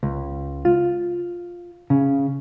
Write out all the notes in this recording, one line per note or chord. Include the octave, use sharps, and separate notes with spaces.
C#2
F4
C#3